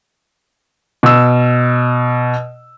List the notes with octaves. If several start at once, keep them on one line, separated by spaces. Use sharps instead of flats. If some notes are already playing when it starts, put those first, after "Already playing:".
B2 E6